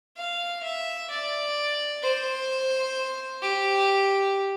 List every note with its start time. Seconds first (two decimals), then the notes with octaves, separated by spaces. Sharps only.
0.17 F5
0.63 E5
1.10 D5
2.03 C5
3.42 G4